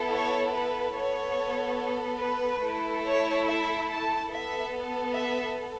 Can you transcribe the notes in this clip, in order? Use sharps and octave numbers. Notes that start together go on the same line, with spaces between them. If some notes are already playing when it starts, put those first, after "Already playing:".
Already playing: B3 E4 A4
C#5
B4
B3 A4 C#5
B4
A3 E4 A4
C#5
E5
A5
B3 A4 E5
E5